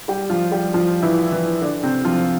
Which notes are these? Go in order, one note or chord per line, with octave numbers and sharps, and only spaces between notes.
G3 G4
F3 F4
G3 G4
F3 F4
E3 E4
E3 E4
D3 D4
C3 C4
F3 F4